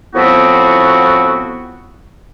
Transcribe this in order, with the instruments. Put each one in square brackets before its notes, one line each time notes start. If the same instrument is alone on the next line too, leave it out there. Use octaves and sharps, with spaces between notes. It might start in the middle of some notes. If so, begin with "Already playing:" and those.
[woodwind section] A2 F3 B3 C4 E4 F#4